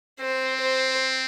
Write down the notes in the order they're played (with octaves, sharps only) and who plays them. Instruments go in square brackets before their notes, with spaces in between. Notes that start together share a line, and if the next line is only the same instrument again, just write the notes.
[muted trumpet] C4 [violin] C5
[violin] C5